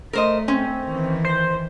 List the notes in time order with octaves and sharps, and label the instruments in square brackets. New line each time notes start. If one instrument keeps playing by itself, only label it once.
[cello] A3 [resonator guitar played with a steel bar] A#4 C5 D#5
[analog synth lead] C4 [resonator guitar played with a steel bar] C#4
[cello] D#3 E3
[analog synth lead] C5